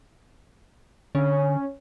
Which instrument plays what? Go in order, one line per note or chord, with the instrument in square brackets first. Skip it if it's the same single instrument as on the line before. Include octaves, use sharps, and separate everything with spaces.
[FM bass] D3 [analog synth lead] C#4